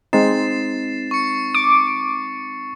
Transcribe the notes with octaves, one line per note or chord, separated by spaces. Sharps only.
G#3 C4 D#4 A6 C7 E7
C#6 C#7
D6